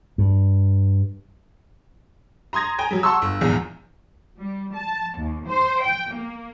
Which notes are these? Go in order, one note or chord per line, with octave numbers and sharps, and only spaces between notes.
G2
A#5 C6 D#6 G#6 A#6
G5 G#5 A#5
F#3 G3
F#5 A5 C6 C#6 E6
G1
A#1 E2 G#2 F3
G3
A5
D#2
C5
G5
A#3